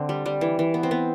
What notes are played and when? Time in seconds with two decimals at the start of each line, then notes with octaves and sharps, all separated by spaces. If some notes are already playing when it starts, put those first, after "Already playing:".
Already playing: D3 C4
0.09 G3
0.26 G3
0.41 E3
0.59 E3
0.74 B3
0.83 C4
0.91 B3